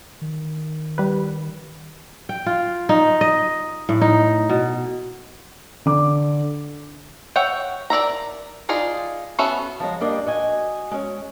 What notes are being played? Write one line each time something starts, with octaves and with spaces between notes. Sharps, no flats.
D#3
G3 B4
G5
F4
D#4
D#5
A2
D#4
B2
D3 D6
C#5 E5 F#5 G5
A#4 D5 E5 A#5
D#4 F4 G#4 D5
B3 C#4 F#4 A4 E5
F3 F#3 G#3 A#5
G3 A#3 D4 D5 D#5
F#4 D#5 G#5
G#3 C#4